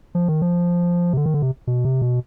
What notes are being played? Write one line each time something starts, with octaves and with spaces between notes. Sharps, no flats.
F3
D#3
F3
C3
D3
D#3
D3
C3
B2
C3
B2